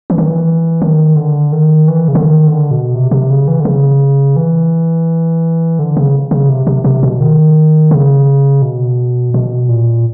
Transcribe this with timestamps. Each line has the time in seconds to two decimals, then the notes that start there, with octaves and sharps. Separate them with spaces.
0.10 E3
0.18 D#3
0.27 E3
0.82 D#3
1.16 D3
1.52 D#3
1.88 E3
2.08 C#3
2.15 D3
2.23 D#3
2.47 D3
2.71 B2
2.95 C3
3.11 C3
3.30 C#3
3.48 E3
3.60 D3
3.65 C#3
4.36 E3
5.79 D3
5.97 C#3
6.31 C#3
6.49 C3
6.67 C3
6.84 C3
7.03 B2
7.21 D#3
7.91 C#3
8.62 B2
9.34 B2
9.69 A#2